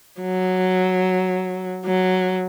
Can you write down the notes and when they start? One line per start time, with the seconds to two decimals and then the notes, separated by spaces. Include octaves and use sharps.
0.21 F#3
1.85 F#3